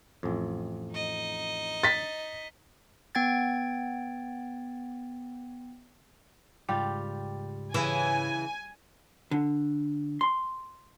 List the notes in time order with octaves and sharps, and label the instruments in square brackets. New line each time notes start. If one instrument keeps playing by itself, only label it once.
[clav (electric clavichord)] A1 F2
[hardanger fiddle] D#4 D#5
[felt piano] A6 B6
[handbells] B3 G5 G#6 A6
[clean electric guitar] C#2 G#2 [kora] G3 F4 G4
[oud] C#3 E3 [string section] G#5
[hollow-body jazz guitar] D3
C6